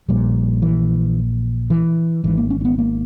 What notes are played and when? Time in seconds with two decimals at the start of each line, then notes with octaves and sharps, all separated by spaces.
0.08 A#1 A#2 G3
0.62 E3
1.70 E3
2.24 G#1 G#2 E3
2.38 A#3
2.50 C#4
2.61 C#4
2.65 B3
2.78 A#3